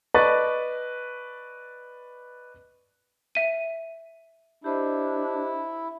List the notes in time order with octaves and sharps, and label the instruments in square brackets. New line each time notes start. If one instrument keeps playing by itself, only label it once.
[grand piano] B4 D5 D#5 A5 C#6 A6
[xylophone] E5 D#7
[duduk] D4 [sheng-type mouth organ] E4 [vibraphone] G4 C5 D#5